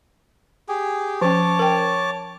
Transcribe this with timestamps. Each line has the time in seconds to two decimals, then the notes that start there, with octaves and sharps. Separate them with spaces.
0.69 G4 G#4
1.21 F3 C#4 C#5 A5 D6
1.59 A#4 G5